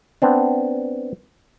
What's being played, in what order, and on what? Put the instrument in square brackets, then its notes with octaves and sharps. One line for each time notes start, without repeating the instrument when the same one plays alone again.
[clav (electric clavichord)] B3 C4 D4